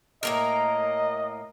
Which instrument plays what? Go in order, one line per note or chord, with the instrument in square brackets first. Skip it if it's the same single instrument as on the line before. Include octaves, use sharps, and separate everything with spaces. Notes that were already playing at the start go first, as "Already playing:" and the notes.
[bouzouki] A2 A#3 A#4 [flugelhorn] D#5